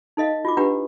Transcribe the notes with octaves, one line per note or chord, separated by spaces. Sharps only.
D#4 A4 D#5 F5
F4 F#4 D6
D4 F4 G4 B4 F#5 A#5